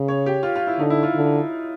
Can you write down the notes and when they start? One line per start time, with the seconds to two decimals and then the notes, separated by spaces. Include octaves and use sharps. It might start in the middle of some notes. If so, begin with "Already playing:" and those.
Already playing: C#3
0.08 C#5
0.26 G4
0.43 F4
0.56 F4
0.67 E4
0.79 D3 D#4
0.90 E4
1.03 F4
1.15 D3